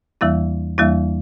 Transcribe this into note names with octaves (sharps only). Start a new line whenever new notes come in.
E2 E3 G3 A#3 E4
E2 E3 G3 A#3 E4